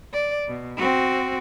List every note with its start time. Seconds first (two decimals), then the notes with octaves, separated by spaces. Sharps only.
0.13 D5
0.48 B2
0.77 C4 F#4